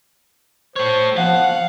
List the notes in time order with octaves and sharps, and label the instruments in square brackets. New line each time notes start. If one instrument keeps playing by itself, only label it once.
[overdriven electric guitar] A3 C#5 [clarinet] C5
[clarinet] F3 [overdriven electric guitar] F5 [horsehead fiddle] F#5